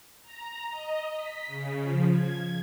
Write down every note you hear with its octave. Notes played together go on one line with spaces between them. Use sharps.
A#5
D#5
B6
C#3
F3
G#6